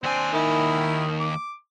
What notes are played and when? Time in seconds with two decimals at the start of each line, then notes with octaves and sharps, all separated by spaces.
0.04 D#2 C4 D4 G#5
0.33 D#3 E4
1.20 D6